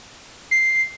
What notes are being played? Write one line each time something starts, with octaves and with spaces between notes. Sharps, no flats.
C7